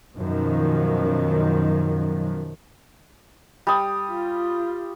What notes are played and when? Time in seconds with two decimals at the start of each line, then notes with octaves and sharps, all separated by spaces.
0.15 F#2 B2 D#3 F3
3.67 G3 D#6
4.10 F4